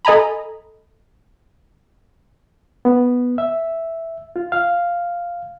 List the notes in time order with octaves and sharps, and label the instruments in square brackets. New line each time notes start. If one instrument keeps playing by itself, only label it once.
[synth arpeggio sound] A4 D#5 G#5 A#5 B5
[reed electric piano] B3
E5
F4
F5